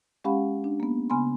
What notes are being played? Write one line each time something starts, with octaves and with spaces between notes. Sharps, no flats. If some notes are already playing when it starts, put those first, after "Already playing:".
G#3 C#4 G4 F5 F#5 B5
D4
A#3 B3
C#3 B3 G#5 B5 C6